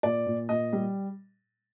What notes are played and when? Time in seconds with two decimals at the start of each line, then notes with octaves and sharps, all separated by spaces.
0.03 A#2 D5
0.26 A#2
0.49 A#2 D#5
0.73 G3